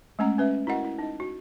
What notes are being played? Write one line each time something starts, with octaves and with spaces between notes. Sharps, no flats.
G#3 A3 C#4 F#5 A#5
C#4 B4 E5
E4 F#4 A#4 D#5 F#5
E4
D#4 D#5
F#4